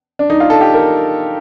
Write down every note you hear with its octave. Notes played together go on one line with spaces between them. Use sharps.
D4
D#4
F4
A4
G4
A#4